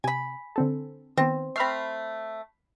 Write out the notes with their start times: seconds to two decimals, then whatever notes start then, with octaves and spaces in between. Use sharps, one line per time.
0.04 C3 G#5 B5
0.56 D3 C4 A4
1.17 D#3 B3 C4
1.56 A3 C4 B5 F6 C7